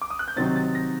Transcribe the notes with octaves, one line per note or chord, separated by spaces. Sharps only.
D6
D#6
F#6
G6
C3 D#3 F#3 C4 D#4 A6
A6
A#6